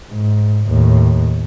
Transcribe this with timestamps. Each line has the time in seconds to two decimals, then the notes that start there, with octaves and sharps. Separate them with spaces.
0.11 G#2
0.67 D#2 A2